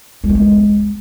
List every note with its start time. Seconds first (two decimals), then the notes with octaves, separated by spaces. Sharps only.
0.24 G3
0.29 B3
0.35 G#3